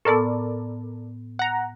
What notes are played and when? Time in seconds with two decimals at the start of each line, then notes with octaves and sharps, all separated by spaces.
0.05 A2 B3 A4 A#4 D5
1.39 F#5 A#5